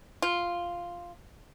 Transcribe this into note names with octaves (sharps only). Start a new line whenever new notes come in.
F4